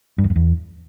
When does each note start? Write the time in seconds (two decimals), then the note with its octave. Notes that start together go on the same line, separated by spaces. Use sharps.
0.18 G2
0.24 E2
0.30 F#2
0.36 E2